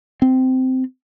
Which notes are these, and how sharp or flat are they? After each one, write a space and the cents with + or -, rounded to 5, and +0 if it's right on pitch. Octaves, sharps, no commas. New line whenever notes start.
C4 -15